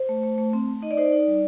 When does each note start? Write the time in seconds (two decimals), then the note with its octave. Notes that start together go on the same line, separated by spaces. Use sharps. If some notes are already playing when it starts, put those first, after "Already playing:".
Already playing: C5
0.09 A3
0.23 A3
0.38 A3
0.53 C4
0.68 A3
0.82 D#4 D#5
0.91 D5
0.97 D#4 C5
1.05 D5
1.12 D#4
1.27 G3